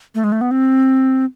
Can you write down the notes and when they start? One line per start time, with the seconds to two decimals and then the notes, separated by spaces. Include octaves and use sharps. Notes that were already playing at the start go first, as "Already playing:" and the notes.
0.15 A3
0.24 G#3
0.32 A3
0.41 B3
0.51 C4